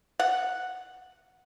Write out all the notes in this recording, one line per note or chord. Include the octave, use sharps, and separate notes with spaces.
F#5